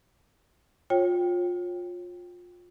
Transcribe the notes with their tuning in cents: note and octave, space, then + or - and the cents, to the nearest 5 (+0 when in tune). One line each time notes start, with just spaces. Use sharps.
F4 +25 C#5 -25 G5 +0